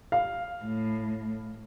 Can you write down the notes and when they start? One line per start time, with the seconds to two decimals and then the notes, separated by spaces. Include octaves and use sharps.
0.12 F5
0.64 A2